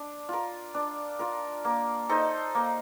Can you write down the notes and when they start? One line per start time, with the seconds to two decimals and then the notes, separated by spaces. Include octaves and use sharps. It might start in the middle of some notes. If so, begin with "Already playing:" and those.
Already playing: D4
0.29 F4 A#4
0.74 D4
1.19 F4 A#4
1.65 A#3
2.09 D#4 A4 C5
2.55 A#3